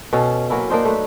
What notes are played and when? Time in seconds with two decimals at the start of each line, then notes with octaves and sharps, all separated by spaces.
0.13 B2 C#4 A4 F5
0.50 F#3 A#3 C#4 E4
0.70 A#3 D4 D#4 C5
0.85 A3 B4